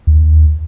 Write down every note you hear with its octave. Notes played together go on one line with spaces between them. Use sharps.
D#2